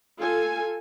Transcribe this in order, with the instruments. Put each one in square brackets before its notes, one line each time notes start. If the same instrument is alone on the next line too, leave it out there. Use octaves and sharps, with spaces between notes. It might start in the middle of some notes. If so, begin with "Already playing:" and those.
[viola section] F4 A4 G#5